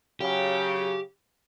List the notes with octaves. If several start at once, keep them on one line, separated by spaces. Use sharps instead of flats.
C#3 F#3 G4